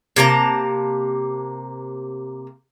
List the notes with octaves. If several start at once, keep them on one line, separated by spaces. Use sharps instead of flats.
C3 A#3 A5 A#5